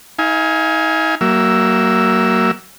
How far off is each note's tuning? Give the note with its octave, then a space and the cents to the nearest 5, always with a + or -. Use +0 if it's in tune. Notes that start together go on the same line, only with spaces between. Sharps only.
D#4 +40 F5 -5 G#5 +0
F#3 +30 A#3 +0 E5 +0